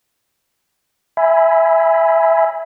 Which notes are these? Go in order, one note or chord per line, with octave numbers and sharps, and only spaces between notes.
E5 G#5 B5